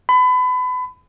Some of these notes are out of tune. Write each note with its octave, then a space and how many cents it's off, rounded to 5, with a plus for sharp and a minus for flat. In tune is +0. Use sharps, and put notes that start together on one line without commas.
B5 +30